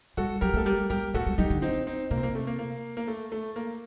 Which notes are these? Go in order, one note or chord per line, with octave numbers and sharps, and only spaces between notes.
G3 F#4 A4
F#3 G4 A#4
A3 A4
G3 G4 A#4
G3 G4 A#4
A3 F#4 A4
G3
F#3 D#4 G4
D3
C4 D#4
C4 D#4
C3 A#3
C4
A#3
A3
A#3
A#3
A#3
A3
A3
A#3